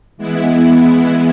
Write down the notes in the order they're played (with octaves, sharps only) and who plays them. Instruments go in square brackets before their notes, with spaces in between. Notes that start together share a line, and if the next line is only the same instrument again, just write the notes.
[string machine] E3 G#3 B3 E4